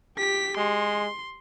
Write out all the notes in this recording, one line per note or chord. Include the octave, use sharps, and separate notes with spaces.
G4 B6
G#3 C6